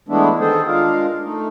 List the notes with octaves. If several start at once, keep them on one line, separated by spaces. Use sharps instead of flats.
E3 G#3 A3 B3 D4 E4
D#3 G#4 A4 C5
G#3 D4 F4 A#4 F5
A3 D#4